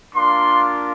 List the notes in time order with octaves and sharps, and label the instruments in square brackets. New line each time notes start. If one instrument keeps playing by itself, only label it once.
[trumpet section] A#3 D4 F4 C6